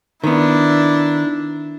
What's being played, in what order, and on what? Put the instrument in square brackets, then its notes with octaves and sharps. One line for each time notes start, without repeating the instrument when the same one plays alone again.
[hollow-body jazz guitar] D#3 B3 [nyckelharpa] D4 E4